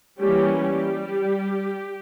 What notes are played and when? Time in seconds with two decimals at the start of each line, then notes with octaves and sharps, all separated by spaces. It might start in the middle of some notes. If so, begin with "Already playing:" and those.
0.19 E3 G3 A#3 C#4 G4
0.59 G3 G4